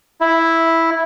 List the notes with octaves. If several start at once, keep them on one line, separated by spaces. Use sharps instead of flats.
E4